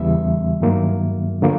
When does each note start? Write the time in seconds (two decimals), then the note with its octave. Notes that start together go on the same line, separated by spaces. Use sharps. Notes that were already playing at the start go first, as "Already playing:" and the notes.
Already playing: E2 C#3 E3 G3 B3 E5
0.60 G2 D#3 F#3 A#3
1.42 D3 F3 A#3